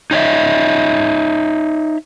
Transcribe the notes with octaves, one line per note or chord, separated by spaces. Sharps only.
D#4 C#5 D#5 E5